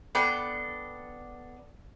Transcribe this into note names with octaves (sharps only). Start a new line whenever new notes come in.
B3 D4 A4 G5